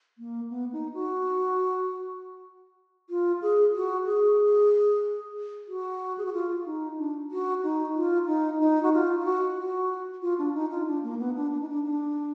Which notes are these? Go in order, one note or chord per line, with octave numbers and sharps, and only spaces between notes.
A#3
B3
D#4
F#4
F4
G#4
F#4
G#4
F#4
G#4
F#4
F4
D#4
D4
F#4
D#4
F4
D#4
D#4
F#4
F4
F4
F#4
F#4
F4
D4
D#4
F4
D4
A#3
B3
D4
D4
D#4
D4
D4